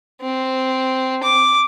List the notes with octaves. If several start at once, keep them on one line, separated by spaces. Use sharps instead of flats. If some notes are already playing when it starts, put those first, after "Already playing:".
C4
D6